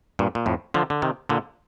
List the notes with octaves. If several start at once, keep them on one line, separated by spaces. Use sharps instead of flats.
G2 A#2
A#2
F2 A2
D3 F3
D3
C3 D#3
A#2 D3